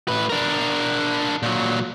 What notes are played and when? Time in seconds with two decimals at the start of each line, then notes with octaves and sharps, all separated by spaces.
0.08 A2 B4
0.29 D4 A#4
1.43 A#2 F#3